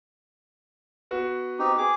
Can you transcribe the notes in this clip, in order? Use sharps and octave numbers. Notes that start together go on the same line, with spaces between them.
B3 F#4
C4 D#4 G4
G#4 D6